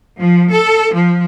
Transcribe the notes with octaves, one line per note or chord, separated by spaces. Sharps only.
F3
A4
F3